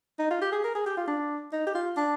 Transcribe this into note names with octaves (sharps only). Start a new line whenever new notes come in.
D#4
F4
G4
G#4
A#4
G#4
G4
F4
D4
D#4
G4
F4
D4